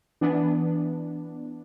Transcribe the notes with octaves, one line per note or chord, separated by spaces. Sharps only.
E3 B3 D4